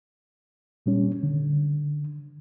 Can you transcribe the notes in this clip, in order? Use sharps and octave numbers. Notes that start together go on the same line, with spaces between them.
A#2 G3 C#4
D3